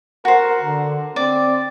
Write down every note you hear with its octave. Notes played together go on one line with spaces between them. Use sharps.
F#4 A#4 C5
D3
C4 D5